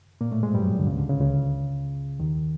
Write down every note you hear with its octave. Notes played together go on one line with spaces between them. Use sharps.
A#2 A#3
A2 A3
G#2 G#3
G2 G3
F#2 F#3
D2 D3
C#2 C#3
D2 D3
C#2 C#3
C#2 C#3
D#2 D#3